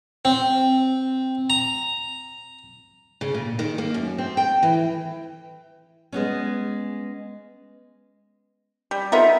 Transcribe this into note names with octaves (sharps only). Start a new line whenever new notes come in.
C4
A#5
C#3
A#2
D#3
A#3
F#2
C4
G5
E3
G#3 B3 C#4
G3
B3 D#4 F4 A4 A#4 E5